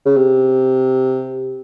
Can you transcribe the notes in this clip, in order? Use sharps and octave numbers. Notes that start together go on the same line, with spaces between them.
C#3
C3